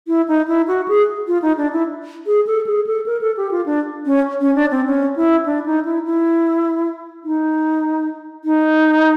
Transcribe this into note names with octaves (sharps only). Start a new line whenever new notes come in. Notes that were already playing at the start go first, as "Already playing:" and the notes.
E4
D#4
E4
F#4
G#4
F4
D#4
D4
E4
G#4
A4
G#4
A4
A#4
A4
G4
F4
D4
C#4
C#4
D4
C4
C#4
E4
D4
D#4
E4
E4
D#4
D#4